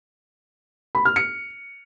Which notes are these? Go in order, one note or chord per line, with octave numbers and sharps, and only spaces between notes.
B5
F6
C#7